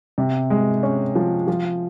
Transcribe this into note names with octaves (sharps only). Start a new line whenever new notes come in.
C3
G#3
C#4
F3
F3